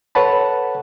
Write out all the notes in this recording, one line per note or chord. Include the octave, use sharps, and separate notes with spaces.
A4 B4 C#5 F#5 A5 B5